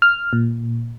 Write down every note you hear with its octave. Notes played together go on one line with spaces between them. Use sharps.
F6
A#2